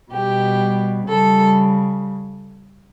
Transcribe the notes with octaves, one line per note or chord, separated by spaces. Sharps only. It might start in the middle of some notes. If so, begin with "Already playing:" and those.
B2 G3 G4
C#3 G3 A4